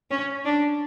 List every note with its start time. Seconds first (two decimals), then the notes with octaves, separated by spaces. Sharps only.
0.11 C#4
0.45 D4